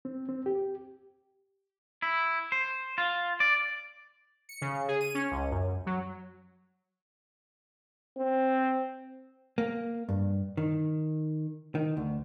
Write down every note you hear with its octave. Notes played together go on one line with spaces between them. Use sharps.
C4
C4
G4
E4
C5
F4
D5
C#7
C#3
G#4
D#7
C#4
C#2
F#2
F#3
C4
A#3
G2
D#3
D#3
D2